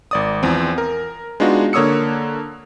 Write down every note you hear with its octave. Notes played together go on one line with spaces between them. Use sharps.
G#1 D5 D#6
E2 F3 C4
A#4
G#3 B3 D4 D#4 F4 F#4
D3 A#3 C#5 D#6 E6 C#7